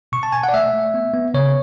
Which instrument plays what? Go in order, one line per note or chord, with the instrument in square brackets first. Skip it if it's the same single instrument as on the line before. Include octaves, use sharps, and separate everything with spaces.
[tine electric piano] B2 C#6
A5
B2 G#5
F#5
D5
A3 E5
A3
B3
B3
C#3 C#5